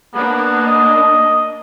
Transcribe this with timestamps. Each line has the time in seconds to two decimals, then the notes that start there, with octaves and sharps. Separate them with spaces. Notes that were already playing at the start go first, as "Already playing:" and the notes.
0.14 A#3 B3 D4
0.66 D#5